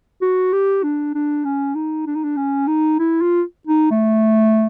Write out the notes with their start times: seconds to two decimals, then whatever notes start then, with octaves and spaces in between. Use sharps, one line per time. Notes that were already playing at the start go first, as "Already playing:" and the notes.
0.22 F#4
0.53 G4
0.83 D4
1.15 D4
1.45 C#4
1.75 D#4
2.06 D4
2.15 D#4
2.24 D4
2.37 C#4
2.67 D#4
2.99 E4
3.21 F4
3.67 D#4
3.91 A3